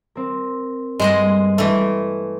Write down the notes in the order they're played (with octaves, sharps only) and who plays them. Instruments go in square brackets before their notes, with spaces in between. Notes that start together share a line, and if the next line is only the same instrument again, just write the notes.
[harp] C4 A#4
[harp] G2 [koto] G#3 C5 D#5
[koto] E3 A3 [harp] G#3